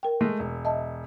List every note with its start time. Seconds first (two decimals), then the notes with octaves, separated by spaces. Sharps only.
0.03 A#4 G5
0.21 G#3 A3
0.39 E1
0.65 D#5 E5 A5